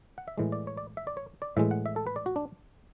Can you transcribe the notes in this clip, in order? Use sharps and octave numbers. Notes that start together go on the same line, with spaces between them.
F#5
E5
A2 E3 G#3
D5
C#5
D5
E5
D5
C#5
D5
A2 E3 G#3 E5
F#5
E5
A4
B4
D5
F#4
D4